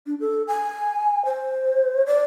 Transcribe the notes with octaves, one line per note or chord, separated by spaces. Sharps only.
D4
A4
G#5
C5
D5